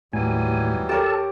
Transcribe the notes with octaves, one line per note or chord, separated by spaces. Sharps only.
D#2 A2 E3 F#3 G3 G#5
G4 A4 A#4 C#5 A5